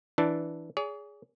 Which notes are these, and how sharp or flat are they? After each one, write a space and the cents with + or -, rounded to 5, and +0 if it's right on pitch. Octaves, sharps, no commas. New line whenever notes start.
E3 +0 D4 +0 A5 +0
G#4 +0 C#5 +45